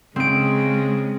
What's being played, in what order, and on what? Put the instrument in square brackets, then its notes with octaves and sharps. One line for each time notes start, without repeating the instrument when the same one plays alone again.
[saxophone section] C#3 [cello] G#3 [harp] C4 D7